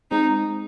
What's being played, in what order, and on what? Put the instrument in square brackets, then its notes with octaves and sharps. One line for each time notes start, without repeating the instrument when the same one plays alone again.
[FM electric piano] G#3 C4 [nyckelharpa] D#4